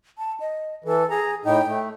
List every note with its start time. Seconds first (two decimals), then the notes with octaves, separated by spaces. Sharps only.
0.18 A5
0.40 D#5
0.84 E3 A4
1.10 G#4 A#5
1.45 A2 D#4 G5
1.68 A3